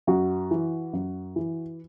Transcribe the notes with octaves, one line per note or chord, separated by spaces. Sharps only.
F#2 F#4
E3
F#2
E3